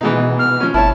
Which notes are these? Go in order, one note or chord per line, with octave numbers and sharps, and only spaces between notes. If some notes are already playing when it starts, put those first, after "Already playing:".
B2 E3 G#3 D#4
F6
F3 C#4
G1 E4 C#5 A5